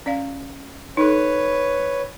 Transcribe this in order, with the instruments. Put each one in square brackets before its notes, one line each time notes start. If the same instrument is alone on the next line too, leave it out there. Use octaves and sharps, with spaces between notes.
[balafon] C#4 D5 F5
[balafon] D#4 A4 [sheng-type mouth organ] B4 C#5